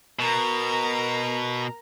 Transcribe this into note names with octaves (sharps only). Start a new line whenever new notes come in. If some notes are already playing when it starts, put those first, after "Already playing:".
B2 A#4 A#5